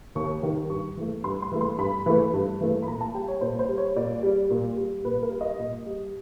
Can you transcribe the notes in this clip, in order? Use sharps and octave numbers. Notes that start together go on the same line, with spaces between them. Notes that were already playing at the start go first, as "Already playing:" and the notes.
D#2 C#6
D#3 G3
G2 C#6
E3 A3
G2 C6
C6
E3 A3
C6
G2 B5
E3 A3
G2
E3 A3
B5
A#2 A#5
A5
G3 G5
C#5
A#2 C5
C5
G3
C#5
A#2 D5
G3
A#2
G3
A#2 B4
A#4
G3
D#5
A#2
G3